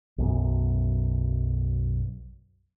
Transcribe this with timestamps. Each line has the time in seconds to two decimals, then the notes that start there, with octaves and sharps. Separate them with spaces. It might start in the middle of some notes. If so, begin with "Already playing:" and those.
0.18 B1 F#2